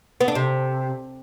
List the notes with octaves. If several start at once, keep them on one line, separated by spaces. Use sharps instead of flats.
B3
D4
C3